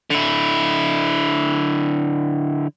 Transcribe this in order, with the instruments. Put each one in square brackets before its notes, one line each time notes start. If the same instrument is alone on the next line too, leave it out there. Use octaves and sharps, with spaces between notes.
[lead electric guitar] D3 E4